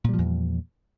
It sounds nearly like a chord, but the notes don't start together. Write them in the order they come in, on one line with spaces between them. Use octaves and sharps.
A#2 G3 F3 E2